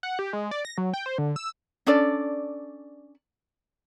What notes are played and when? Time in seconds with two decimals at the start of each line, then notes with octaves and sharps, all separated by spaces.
0.03 F#5
0.19 G4
0.33 G#3
0.51 D5
0.65 A#6
0.78 F#3
0.94 G5
1.06 C5
1.18 D3
1.36 E6
1.87 C#4 D4 A4 D5